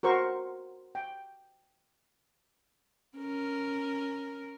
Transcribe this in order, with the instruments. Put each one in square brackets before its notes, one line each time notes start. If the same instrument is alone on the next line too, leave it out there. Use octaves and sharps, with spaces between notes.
[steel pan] F#4 A#4 C5 C#6
G5
[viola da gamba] C#4 A#4